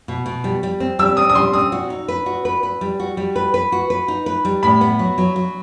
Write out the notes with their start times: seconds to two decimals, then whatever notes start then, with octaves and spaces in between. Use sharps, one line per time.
0.08 B2
0.26 B2
0.44 G3
0.63 G3
0.80 C4
0.99 G3 E6
1.17 C4 D#6
1.30 D#6
1.35 G3 C6
1.53 C4 D#6
1.72 F#4
1.90 D#4
2.08 B4
2.26 F#4
2.45 B4
2.63 B4
2.81 G3
3.00 F#4
3.17 G3
3.36 B4
3.54 B4
3.72 F#4
3.90 B4
4.08 D#4
4.26 B4
4.45 G3
4.63 A2 B5
4.81 B3
4.99 F#3
5.18 F#3
5.36 F#3